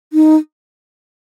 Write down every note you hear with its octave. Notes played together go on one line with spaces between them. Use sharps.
D#4